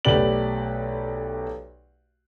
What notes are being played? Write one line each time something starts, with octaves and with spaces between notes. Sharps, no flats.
B1 A3 G4 B4 D5 F#7